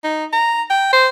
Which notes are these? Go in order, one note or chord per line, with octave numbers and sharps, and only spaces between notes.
D#4
A#5
G5
C5